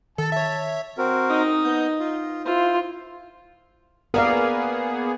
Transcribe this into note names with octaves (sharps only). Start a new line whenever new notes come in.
D#3 A4 A5
C#5 E5
C4 F#4 A#4
D#4 D#5
B3 G6
F4
E4 F4 C5
A#3 B3 G#4 A#4 D5 F5